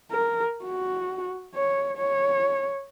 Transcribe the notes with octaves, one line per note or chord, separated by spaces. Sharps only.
A#4
F#4
C#5
C#5